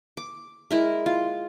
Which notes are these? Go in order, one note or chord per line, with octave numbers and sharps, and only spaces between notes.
D6
G#3 E4 A#4
F4